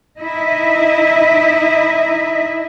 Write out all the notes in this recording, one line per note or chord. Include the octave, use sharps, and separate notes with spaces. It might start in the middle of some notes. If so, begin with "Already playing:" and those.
D#4 E4 D#5 E5